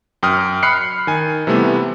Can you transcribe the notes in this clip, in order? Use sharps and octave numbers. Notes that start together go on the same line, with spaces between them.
F#2 G5 D#6 F6
B5 F6 F#6 C7 C#7
D#3 G#5
C3 E3 G3 A3 B3